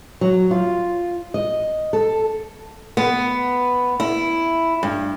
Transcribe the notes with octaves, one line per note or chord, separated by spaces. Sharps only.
F#3
F4
D#5
A4
B3
E4
G2